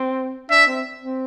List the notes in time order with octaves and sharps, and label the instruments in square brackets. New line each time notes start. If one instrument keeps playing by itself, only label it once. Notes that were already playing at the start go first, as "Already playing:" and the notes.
Already playing: [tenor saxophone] C4
[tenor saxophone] D4 [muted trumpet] E5
[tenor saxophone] C4
C4